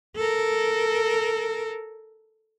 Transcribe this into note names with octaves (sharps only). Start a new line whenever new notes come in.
A4 A#4